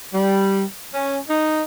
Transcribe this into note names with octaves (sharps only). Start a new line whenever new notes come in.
G3
C#4
D#4